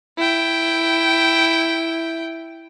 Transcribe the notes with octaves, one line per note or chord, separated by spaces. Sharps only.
E4 G5